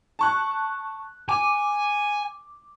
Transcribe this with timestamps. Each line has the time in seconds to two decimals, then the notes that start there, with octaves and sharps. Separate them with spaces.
0.19 A5 C#6 F#6
1.29 G#5 D6